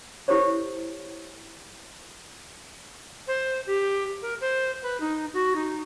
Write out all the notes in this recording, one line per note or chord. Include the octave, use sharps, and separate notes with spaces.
E4 G4 A4 C5 C#5
C5
G4
A#4
C5
B4
D#4
F#4
D#4